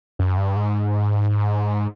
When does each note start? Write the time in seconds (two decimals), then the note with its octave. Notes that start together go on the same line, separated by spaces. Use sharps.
0.19 F#2
0.37 G2
0.56 G#2